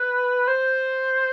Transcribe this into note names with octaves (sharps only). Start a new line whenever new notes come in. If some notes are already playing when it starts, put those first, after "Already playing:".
Already playing: B4
C5